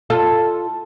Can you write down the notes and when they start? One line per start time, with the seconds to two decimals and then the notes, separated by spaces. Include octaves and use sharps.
0.10 F4 A4